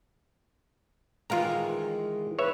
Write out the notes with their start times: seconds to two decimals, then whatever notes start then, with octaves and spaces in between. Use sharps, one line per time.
1.30 D#3 E3 G#3 F4 F5 A#5
2.39 B4 C#5 E5